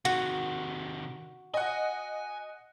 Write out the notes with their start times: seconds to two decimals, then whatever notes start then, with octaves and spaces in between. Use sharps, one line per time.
0.05 C3 D#3 F#4
1.54 D#5 F#5 G#5